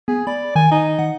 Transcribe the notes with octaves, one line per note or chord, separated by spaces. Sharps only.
B3 G#4
D5 B5
D#3 G#5
D#4
F#5